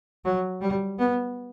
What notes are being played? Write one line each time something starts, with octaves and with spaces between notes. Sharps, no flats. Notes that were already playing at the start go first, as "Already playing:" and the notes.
F#3
G3
B3